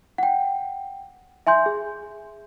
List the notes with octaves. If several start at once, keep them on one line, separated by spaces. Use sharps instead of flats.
F#5 G5
E5 G#5 C6 G6
G#4